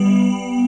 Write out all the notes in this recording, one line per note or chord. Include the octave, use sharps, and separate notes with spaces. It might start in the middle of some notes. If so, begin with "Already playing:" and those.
Already playing: G3 B3